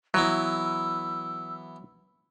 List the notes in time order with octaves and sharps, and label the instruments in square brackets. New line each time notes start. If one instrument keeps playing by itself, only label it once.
[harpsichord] E3 B3 E4 [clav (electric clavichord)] F#3 [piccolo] E6